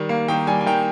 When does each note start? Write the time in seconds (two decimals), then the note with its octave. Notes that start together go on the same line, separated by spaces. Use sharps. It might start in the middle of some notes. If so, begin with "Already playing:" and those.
Already playing: D#3 G3
0.09 A#3
0.28 D#3 G5
0.47 G3 G#5
0.61 G#5
0.66 D#3 G5